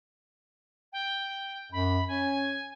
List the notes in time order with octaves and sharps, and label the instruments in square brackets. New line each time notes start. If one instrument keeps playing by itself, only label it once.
[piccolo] G5
[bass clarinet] F#2 [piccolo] B5
[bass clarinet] C#4 [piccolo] G#5